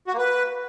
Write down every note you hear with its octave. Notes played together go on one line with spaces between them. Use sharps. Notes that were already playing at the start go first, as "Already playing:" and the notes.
F#4
A#3
B4